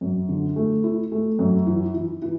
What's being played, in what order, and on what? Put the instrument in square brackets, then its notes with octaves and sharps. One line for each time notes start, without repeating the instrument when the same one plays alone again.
[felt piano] F#2
D3
A3
E4
A3
F#2
E3
E3
E3